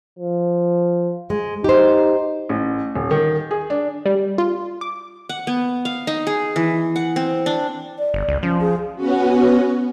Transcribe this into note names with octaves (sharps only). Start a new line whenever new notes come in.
F3
G#3
D#4 G4 C5
A1
D#1
D#3
G#4
D4
G3
F4
D6
F#5
B3
F5
D#4
G#4
E3
F#5
C4
D4
D5
G1
C#2
F3 C#4
G#4
B3 C#4 F#4